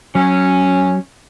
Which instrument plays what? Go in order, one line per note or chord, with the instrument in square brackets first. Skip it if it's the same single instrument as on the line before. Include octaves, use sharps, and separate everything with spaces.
[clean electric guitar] F#3 [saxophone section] C#4